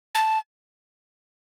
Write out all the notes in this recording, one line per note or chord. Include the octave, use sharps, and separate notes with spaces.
A5